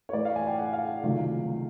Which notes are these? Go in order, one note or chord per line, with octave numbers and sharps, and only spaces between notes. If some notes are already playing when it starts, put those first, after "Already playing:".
C#5
A2 E3 A3 D5
F5
G#5
G5
F#5
F5
C#2 C3 D#3 F#3 A3 F5